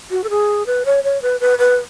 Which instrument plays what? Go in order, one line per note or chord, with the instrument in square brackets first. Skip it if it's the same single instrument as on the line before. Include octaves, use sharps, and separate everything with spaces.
[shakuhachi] F#4
A4
G#4
B4
C#5
C#5
B4
B4
B4